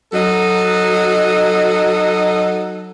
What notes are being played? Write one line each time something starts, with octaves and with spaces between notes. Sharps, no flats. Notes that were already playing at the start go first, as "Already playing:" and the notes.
F#3 D#4 A4